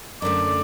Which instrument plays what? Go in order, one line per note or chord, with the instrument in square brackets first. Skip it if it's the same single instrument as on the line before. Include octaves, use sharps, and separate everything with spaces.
[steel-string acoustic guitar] F#2 D3 A3 [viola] D5